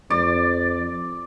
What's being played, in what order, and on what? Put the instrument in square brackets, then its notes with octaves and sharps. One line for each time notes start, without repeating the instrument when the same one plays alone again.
[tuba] F2 [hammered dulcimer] D5